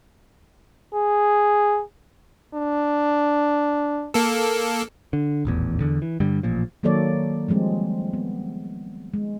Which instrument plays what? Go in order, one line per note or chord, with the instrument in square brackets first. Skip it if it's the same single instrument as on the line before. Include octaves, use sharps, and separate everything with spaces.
[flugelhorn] G#4
[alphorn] D4
[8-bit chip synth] A#3 A4
[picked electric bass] D3
D#1 A1 E2
E2 D3
E3
G2 D3 G3
A1 A#2 F3
[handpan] D#3 F#3 A#3 A4 C#5 D5
F3 G3 G#3 C4
B3
G#3